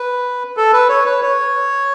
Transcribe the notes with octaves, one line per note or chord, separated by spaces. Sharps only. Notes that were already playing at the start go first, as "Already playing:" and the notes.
Already playing: B4
A4
B4
C#5
B4
C#5